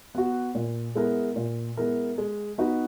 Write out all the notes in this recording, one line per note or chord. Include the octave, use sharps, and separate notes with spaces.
B3 F#4
A#2
G#3 B3 E4 A#4
A#2
G#3 B3 E4 A#4
G#3
B3 D#4 F#4 B4